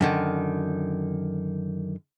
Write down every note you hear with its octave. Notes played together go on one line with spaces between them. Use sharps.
F#2 D3 D#3